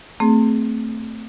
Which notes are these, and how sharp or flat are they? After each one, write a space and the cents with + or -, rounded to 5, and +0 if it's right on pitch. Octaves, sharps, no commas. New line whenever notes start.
A3 +20 C4 -5 G#4 +25